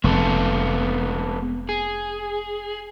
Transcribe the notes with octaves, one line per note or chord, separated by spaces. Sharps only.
F1 G#3 B3 A4
G#4